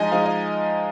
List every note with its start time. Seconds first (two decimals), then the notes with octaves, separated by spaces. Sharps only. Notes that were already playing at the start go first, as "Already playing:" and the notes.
Already playing: F3 G#3 D#4 D#5 G#5 A#5
0.12 F3 G#3 D#4 F5
0.26 D#5